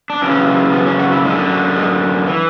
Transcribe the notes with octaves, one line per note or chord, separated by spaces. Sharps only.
D4
F#2 C#3 E3 C#4
B3
C#4
F#4
E4
F#2 D3 G#3
F#3
G#3
E3